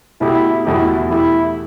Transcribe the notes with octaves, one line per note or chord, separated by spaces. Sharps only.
B2 A3 E4 G4
E2 B2 A3 E4 G4
E3 A3 E4 G4